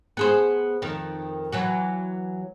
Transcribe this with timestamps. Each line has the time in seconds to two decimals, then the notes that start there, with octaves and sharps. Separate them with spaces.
0.17 B3 G#4 C5
0.82 F2 D#3
1.52 E3 F#3 F#4